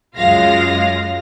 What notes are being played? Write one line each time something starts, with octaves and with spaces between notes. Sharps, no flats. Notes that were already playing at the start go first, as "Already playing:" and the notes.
C#2 F#2 G#3 F4 F5 A#6